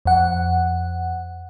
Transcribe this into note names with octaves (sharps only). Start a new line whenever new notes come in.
F2 F#5